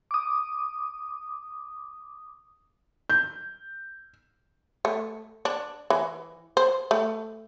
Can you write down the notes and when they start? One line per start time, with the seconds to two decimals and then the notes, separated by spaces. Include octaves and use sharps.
0.11 D6 D#6
3.10 G6
4.85 A3
5.45 D4
5.90 E3
6.57 C5
6.91 A3